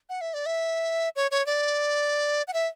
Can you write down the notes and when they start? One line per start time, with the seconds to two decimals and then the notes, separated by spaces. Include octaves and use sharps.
0.09 F#5
0.21 E5
0.34 D5
0.46 E5
1.16 C#5
1.31 C#5
1.46 D5
2.48 F#5
2.53 E5